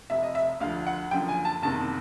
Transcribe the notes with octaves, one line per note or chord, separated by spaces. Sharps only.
F1 F2 C3 E5
D#5
E5
D2 D3 F3 F5
F#5
F#1 F#2 D3 F3 G5
G#5
A5
F#1 E2 C3 D#3 A5